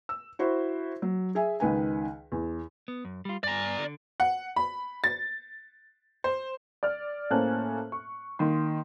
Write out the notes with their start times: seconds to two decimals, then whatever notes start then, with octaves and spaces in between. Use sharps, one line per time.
0.09 E6
0.39 E4 F#4 C5
1.02 F#3
1.35 G#4 E5 G#5
1.60 C#2 D#3 B4 G#5
2.32 E2
2.88 B3
3.05 F#2
3.25 G3 F4
3.43 G2 D5 G#5 A#5
3.79 D3
4.20 F#5
4.56 B5
5.04 A6
6.24 C5
6.83 D5 F6
7.30 A2 A#3 C#4 C5 A5 F#6
7.92 C#6
8.39 D#3 A#3 C6